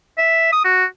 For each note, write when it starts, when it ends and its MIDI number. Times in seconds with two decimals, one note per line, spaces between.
0.18 0.48 76
0.52 0.63 87
0.64 0.85 66